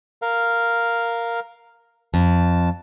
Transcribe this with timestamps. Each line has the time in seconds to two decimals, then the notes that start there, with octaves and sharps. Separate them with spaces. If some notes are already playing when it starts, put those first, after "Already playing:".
0.22 A#4 F5
2.14 F2 A5